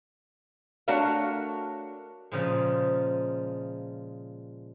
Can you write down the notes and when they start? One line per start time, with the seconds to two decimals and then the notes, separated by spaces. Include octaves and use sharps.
0.88 A3 D4 F#4 A#4 C#5 F5
2.32 A#2 C#3 F3 G#3